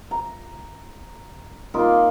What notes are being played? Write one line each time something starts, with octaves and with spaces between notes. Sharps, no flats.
A#5
A#3 D#4 F4 A#4